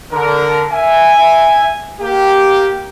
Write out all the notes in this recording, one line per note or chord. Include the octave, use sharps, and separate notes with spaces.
D3 A#4
E5 G#5
A#3 G4